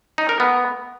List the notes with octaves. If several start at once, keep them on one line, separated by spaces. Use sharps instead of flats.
D#4
A#4
B3